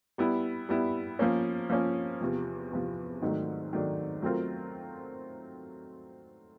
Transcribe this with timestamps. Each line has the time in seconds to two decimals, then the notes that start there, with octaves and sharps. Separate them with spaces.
0.18 G3 B3 E4
0.69 G3 B3 E4
1.19 F3 A#3 C#4
1.70 F3 A#3 C#4
2.21 E2 C3 F3
2.71 E2 C3 F3
3.22 G#2 D#3 F#3 A3 D4
3.73 G#2 D#3 F#3 A3 D4
4.22 F#3 A3 C4 F4 A#4